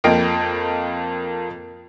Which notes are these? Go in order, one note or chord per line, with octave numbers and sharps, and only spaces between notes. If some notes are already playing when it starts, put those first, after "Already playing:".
F2 A#3 F4 D#5 G5 D7